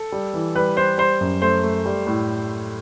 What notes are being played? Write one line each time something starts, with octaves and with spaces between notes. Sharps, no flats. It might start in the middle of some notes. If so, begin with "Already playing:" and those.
Already playing: A4
G3
E3
G3 B4
G3 C5
G3 C5
F#2
A3 C5
A3
G3
A2